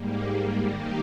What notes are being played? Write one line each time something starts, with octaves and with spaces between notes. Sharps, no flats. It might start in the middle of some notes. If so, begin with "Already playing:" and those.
Already playing: G#2 G3 A#3
D#3 A#3 D#4 G4